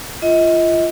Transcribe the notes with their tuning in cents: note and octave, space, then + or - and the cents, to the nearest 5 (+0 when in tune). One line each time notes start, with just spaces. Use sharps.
F4 -25 D#5 +35